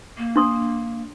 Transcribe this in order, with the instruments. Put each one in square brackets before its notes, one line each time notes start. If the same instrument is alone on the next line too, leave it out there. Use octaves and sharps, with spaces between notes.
[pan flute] A#3
[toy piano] D4 C6 D#6